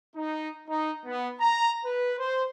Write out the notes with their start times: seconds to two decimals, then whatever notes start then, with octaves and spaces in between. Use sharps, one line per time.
0.16 D#4
0.69 D#4
1.05 B3
1.40 A#5
1.85 B4
2.19 C5